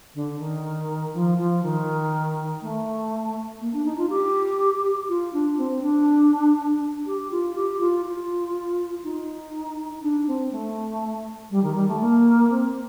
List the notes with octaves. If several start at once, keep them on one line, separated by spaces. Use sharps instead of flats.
D3
D#3
F3
F3
D#3
A3
A#3
D4
D#4
F4
G4
F4
D4
C4
D4
G4
F4
G4
F4
F4
D#4
D4
C4
A3
G3
D#3
G3
A3
A#3
C4